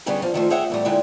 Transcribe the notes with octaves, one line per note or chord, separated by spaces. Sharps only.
D3 G3 B3 C#4 G4 G#4
F3 F5
D#3 F3 A3 C5
G#4 C#5 E5 F#5 G5
E2 A2 G3
A#2 D3 G#3 E4 G5